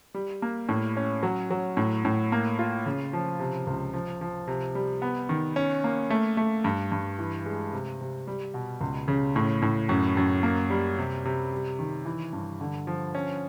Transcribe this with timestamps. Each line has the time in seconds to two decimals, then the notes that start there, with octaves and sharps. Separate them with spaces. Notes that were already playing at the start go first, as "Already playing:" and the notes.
0.15 G3
0.42 A#3
0.69 A2
0.97 C#4
1.23 F#3
1.50 F#3
1.77 A2
2.05 A2
2.32 A#3
2.59 F4
2.86 C#3
3.13 F3
3.40 C3
3.67 C#2
3.93 F3
4.21 F3
4.48 C3
4.75 G3
5.02 B3
5.29 D#3
5.56 C#4
5.84 A#3
6.10 A3
6.37 A3
6.64 G2
6.92 G2
7.19 E3
7.46 G#3
7.73 C3
8.01 C3
8.27 G3
8.54 B2
8.81 C#2
9.08 C#3
9.36 A2
9.62 A2
9.89 F#2
10.17 F#2
10.43 A#3
10.70 G3
10.98 C3
11.25 C3
11.52 G3
11.79 D#3
12.06 E3
12.33 G2
12.61 D3
12.87 F3
13.15 C#4